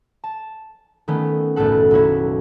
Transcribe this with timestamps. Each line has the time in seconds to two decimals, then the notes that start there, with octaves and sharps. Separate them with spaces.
0.24 A5
1.08 D#3 A3 B3 C#4
1.56 F#1 B1 A2 A3 A4 F#5
1.91 B1 A#3 E4 C#5